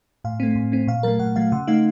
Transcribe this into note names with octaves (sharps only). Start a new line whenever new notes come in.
A2 F5
A3 C4
A2
A3 C4
A#2 F5
F#3 A3 A#4
A#2 F#5
F#3 A3 F5
C#3 F#5
A3 D#4 F5